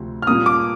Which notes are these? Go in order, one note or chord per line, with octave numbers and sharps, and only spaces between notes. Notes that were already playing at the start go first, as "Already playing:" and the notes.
Already playing: D2 C3 F3 C4
F6
A#2 G3 A#3 D#6
D6